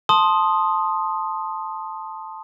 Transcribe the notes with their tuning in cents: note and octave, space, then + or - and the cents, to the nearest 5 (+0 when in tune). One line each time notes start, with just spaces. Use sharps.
A5 +0 C6 +10 D#6 +0